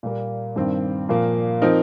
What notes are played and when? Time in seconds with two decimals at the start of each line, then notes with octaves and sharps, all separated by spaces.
0.03 A#2 G3 A#3
0.56 G2 D#3 C4
1.09 A#2 F3 A#3
1.62 F3 C4 D#4 A#4